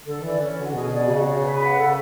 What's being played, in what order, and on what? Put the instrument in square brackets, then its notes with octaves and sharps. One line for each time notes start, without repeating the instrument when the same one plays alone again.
[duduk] D3 [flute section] A4
[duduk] E3 [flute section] D5
[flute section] C#4
[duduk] D3 [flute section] F#4
[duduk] B2 [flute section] G#4
[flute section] D5
[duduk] C#3 [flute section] F#4
[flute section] C#5
B4
F#5
[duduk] C#3 [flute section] A4